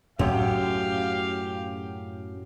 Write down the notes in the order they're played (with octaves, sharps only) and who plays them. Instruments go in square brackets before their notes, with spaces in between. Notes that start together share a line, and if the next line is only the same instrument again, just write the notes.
[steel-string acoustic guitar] F#2 [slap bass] A2 C#4 [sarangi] G4 [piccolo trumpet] F5